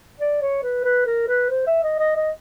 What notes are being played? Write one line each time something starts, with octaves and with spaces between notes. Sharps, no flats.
D5
C#5
B4
B4
A#4
B4
C5
E5
D#5
D#5
D#5